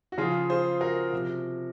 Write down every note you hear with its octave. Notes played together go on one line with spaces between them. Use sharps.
F#4
C#3 F3 F4 G#4
G#4 C5
F#4 A#4
C3 F3 F#4